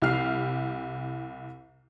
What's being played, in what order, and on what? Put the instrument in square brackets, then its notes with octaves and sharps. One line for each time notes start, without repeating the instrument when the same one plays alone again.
[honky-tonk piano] C2 E4 G4 F6 C7